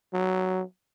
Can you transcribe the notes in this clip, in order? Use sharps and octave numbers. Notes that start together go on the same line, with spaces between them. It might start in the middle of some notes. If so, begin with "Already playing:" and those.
F#3